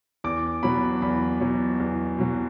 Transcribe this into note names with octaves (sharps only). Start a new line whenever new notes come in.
E2 D6
B2 F#3 B5
E2 B5
B2 F#3
E2
B2 F#3